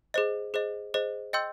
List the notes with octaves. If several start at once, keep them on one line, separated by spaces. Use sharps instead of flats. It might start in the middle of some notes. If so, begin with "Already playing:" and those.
G#4 C5 D#5
G#4 C5 D#5
G#4 C5 D#5
D#5 G5 C6 E6 G6